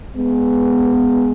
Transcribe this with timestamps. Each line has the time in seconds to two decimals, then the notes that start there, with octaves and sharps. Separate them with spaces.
0.16 G#3 B3